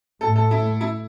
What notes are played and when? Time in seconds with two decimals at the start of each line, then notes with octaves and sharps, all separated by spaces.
0.21 A2 A3 A4
0.36 A4
0.51 E4
0.81 E4